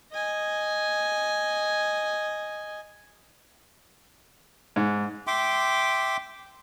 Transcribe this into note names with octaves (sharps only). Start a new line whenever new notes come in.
D#5 G#5
G#2
E5 G5 C6 D6